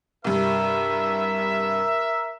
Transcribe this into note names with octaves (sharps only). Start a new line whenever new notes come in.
C2 G2 A#4 E5